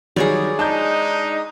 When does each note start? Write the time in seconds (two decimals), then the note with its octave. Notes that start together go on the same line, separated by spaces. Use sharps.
0.16 D#3 F#3 G3 G#4 C#5 D5
0.59 G#3 D4 D#4 A5 G6